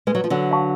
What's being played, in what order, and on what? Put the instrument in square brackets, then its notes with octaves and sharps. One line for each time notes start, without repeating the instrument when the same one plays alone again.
[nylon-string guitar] G#3 [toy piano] B4
[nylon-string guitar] F#3
F3
D3 F#3
[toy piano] F5 A5 C#6